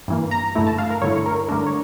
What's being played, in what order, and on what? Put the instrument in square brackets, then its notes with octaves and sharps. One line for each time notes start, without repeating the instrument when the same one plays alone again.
[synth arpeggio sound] G2 E3 A#3
A#5
G2 D3 A3 E4
A5
F5
A#4
G2 D3 A3 E4 C#5
A#4
G2 D3 A3 D4 A#4
C#5